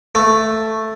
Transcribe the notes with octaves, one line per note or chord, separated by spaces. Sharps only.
A3